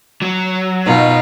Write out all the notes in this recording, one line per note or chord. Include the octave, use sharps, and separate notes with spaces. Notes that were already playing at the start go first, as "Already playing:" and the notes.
F#3
B2 D#4 F4